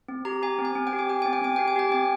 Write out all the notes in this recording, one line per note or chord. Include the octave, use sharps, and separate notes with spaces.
C4
G4 A#5
G4 G#5
C4
G#5
C4
G5
G4
G#5
G4 G5
C4 G#5
G5
C4 G#5
G4 G5
G#5
G4 G5
C4 G#5